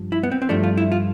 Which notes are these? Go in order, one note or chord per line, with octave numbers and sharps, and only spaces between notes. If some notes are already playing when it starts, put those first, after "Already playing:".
Already playing: G2 F3
E4
B3
C4
C4
G2 F3 A3 D4
F4
E4
F4